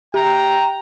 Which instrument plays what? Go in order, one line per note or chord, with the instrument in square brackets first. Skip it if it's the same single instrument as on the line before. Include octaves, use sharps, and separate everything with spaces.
[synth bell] G4 [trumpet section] G5 A#5